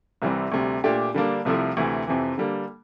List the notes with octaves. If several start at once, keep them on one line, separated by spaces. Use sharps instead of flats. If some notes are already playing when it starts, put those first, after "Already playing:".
C2 C3 E3 G3 C4
D2 C3 G3
A#2 A3 D4 G4
D3 G3 A#3 D4
C2 C3 F3 A3 E4
D2 C3 E3
F2 C3 E3
D3 G3 A#3